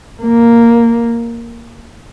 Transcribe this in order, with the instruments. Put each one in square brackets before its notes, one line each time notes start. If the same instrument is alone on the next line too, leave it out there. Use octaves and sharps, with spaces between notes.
[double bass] A#3